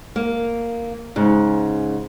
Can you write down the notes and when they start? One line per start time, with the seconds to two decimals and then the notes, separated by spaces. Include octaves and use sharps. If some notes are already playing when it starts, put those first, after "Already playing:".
0.16 A#3
1.16 G#2 C#3